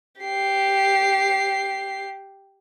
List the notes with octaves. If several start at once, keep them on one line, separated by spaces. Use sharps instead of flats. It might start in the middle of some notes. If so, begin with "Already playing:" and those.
G4 C7